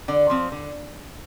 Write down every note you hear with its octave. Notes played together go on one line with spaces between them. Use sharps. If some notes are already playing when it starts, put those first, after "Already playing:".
D3 D5
F3 C4
D3